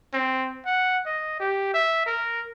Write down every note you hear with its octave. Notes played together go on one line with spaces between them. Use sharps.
C4
F#5
D#5
G4
E5
A#4